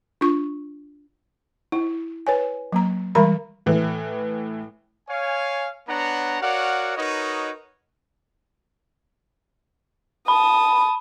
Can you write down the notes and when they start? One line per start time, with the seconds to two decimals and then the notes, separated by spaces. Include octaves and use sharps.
0.21 D4 F4 C#6
1.72 E4
2.27 B4 C#5 G#5
2.73 F#3 A#3 A#5
3.15 E3 G3 G#3 A#4 A#5 B5
3.66 A2 E3
5.09 C#5 F5 G#5
5.89 B3 D4 C#5 F#5 A#5
6.42 F#4 A#4 C#5 D5 F5 F#5
6.97 D#4 F#4 A#4 B4 C#5 D#5
10.28 A5 B5 D#6